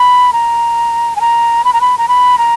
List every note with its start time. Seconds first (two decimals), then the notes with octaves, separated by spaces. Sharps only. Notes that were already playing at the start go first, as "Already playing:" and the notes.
Already playing: B5
0.33 A#5
1.16 G#5
1.21 A#5
1.64 B5
1.73 A#5
1.81 B5
1.98 A#5
2.08 B5
2.38 A#5